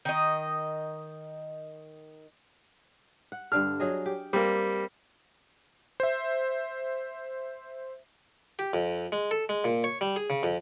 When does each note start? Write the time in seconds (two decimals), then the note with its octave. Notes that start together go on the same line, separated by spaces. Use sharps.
0.05 D#3 D#5
3.32 F#5
3.52 G2 D3 A4 F6
3.80 F#3 G#4 D#5
4.06 G4
4.33 G3 A#3 C4
6.00 C5 E5
8.59 G4
8.73 F2
9.12 G#3
9.31 A4
9.49 G#3
9.64 A#2
9.84 C#5
10.01 G3
10.16 G#4
10.30 C#3
10.43 F2